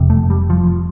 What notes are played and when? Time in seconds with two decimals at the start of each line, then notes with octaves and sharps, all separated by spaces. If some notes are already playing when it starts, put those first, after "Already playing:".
Already playing: F1 F2 C3
0.10 A3
0.30 G3
0.50 F3